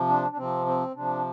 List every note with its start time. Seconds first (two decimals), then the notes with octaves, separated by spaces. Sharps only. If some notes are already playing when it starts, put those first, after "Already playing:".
Already playing: C3 F3
0.08 D4
0.32 D4
0.37 C3 F3 C4
0.66 C4
0.95 C3 F3 D4